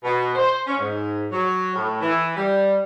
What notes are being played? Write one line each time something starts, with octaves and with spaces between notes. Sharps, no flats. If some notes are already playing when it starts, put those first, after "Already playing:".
B2
C5
C#4
G#2
F#3
A2
E3
G3